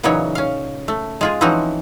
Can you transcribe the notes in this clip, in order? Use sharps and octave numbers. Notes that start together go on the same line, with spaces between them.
A#2 C#3 E3 F#3 D#4 C#5
C#4 F5
A3
G#3 F4 G#4
E3 F3 C4 C#4 D#4 F#4